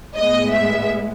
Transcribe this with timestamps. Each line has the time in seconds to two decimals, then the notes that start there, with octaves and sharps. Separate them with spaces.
0.17 A2 G#3 B3 D#5
0.53 E5